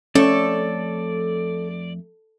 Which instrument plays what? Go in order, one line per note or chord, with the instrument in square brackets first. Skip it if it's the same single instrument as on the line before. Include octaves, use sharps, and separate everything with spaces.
[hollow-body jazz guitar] F2 A3 C#5 [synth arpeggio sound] C#4 [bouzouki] A4 [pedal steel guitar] D5